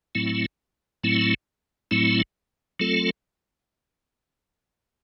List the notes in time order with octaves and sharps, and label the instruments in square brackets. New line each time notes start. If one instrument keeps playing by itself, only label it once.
[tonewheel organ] A2 F#3 A3 C4 E4
A2 F#3 A3 C4 E4
A2 F#3 A3 C4 E4
F#3 A3 C4 F4 A4